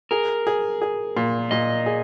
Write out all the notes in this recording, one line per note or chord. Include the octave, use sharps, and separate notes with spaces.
G#4 A#4
G#4
G#4
A#2
A#2 D#5
G#4